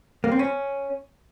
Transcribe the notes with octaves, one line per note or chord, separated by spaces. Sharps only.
A#3
C4
C#4